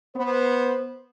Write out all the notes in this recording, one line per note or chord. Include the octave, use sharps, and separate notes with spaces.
B3 C5